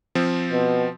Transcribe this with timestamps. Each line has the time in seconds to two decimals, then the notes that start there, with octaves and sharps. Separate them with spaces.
0.15 F3 C4
0.52 B2